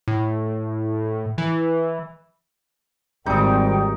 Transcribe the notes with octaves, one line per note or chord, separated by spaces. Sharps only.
A2
E3
G#1 G3 C4 D#4 G5